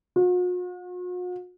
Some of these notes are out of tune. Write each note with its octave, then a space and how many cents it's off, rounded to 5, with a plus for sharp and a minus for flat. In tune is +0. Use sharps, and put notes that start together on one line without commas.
F#4 -45